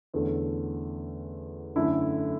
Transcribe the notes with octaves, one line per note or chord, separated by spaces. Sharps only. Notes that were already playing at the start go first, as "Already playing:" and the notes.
E2 D3 A3 C#4
F#2 D3 A3 E4